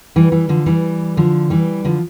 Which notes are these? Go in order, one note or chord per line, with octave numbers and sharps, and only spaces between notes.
E3 G3
E3 G3
D3 F3
E3 G3
D3 F3
E3 G3
D3 F3